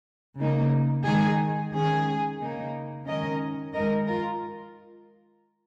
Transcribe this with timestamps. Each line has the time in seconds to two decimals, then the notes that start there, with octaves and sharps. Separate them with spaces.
0.39 C#3 A#3 D#4
1.05 D#3 G#3 D#4 G#4
1.72 D#3 G#3 C#4 G#4
2.40 C#3 A#3 D#4
3.07 D#3 G#3 C#4 A#4 D#5
3.74 D#3 G#3 D#4 A#4 D#5
4.08 F4 A#4